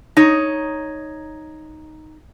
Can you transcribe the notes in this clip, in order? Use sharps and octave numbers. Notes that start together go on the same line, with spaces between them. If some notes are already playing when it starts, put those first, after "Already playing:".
D#4 C#5